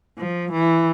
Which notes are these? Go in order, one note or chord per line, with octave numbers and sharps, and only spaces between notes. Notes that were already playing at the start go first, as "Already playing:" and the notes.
F3
E3